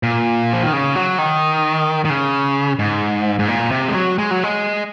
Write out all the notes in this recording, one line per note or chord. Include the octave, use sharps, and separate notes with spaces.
A#2
F3
D#3
C#3
F#3
D#3
D#3
C#3
G#2
G#2
A#2
C3
G#3
F#3
G#3
F#3
G#3